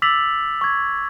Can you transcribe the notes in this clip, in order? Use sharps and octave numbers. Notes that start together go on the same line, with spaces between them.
D6 E6 A6 B6 F7 F#7
C#6 G#6